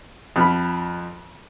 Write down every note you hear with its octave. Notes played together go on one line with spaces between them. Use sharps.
F2 F3 B5